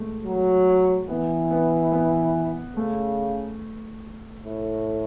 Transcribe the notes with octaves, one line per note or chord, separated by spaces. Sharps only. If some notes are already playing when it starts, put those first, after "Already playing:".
Already playing: G#3 A3
F#3
E3 B3
B3
B3
C#3 A3
A2